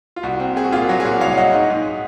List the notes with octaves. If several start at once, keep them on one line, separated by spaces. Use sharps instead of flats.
F4
C2 F#4
C4
C4 G#4
F#4
A#2 F4 G#4
F#3 F#4
G#4
A#2 F#4
C2 C#5 F5
F5
F#3 D#5 F#5
G#2
G#2